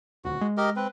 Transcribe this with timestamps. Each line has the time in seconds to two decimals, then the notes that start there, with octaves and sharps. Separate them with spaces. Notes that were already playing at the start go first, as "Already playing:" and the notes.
0.25 D#1 D2 F#4
0.41 G#3
0.57 G4 A#4 D#5
0.76 C4 B4